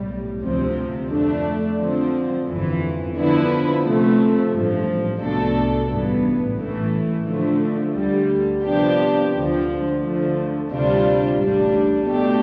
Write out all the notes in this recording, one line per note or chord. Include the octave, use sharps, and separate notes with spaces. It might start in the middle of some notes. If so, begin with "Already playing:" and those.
Already playing: B1 A2 G3
D2 C3 F3 C4
F2 D3 A3 D4
D3 F3 C4
G1 F2 E3
D3 F3 B3 E4 B4
C3 F3 A3 C4
A1 G2 F3
C2 B2 A3 D4 A4
A1 G2 E3 B3
A1 A2 E3 A3
D3 F3 A3
D2 D3 G3
C3 F3 B3 D4 G4
D2 D3 F3
D3 F3 A3
D2 C3 G3 D4 F4
A1 A2 G3 D4
B2 A3 D4 G4